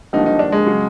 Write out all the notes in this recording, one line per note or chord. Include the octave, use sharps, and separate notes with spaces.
G#1 G2 D3 F3 A#3 D#4
D#4
D4
G#3
C#3 F#3